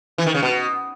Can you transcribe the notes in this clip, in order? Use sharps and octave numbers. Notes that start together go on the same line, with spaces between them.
E3
D#3
C#3
B2